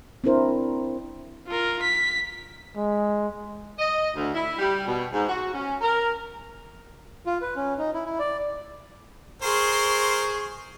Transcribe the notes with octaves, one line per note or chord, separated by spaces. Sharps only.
C4 D4 E4 A#4 C5
F4 A#4
B6
G#3
D#5
D2
E4
G3
B2
G#2
F#4
C#4
A#4
F4
B4
C#4
D#4
E4
E4
D5
G#4 A#4 C5 C6 C#6